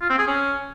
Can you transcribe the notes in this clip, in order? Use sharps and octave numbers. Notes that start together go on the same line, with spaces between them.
F4
C4
G#4
C#4